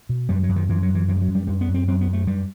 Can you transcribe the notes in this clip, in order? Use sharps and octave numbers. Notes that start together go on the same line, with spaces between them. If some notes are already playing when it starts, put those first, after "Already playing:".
B2
F#2 G3
F#3
F#2
D#3
F#2 E3
F#3
F#2
E3
F#2 E3
G3
F#3
F#2
G3
F#2 G3
B3
F#2
C4
F#2 C4
B3
F#2
A3
F#2 G3